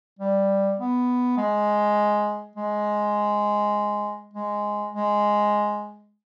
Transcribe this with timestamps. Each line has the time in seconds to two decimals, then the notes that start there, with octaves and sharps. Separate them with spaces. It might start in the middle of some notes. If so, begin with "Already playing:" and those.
0.19 G3
0.79 B3
1.37 G#3
2.56 G#3
4.34 G#3
4.93 G#3